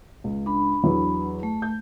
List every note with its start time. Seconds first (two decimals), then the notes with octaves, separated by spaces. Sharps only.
0.24 C#2
0.46 D4 B5
0.84 E2 F#3
1.43 A3
1.62 G6